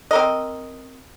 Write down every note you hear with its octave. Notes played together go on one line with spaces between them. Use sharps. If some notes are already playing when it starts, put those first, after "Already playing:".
C4 A#4 D#5